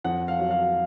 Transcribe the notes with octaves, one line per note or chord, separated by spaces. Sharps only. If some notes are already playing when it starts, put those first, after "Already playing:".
F2 F#5
F5
F#3
F5